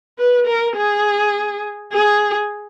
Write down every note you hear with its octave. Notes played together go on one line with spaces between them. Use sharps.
B4
A#4
G#4
G#4